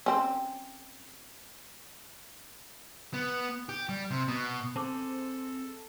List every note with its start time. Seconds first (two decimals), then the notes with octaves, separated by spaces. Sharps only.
0.06 C4 C#4
3.14 B3
3.69 G4
3.89 G3
4.11 C3
4.28 B2
4.76 C4 G#4 A4 C5 A5 D6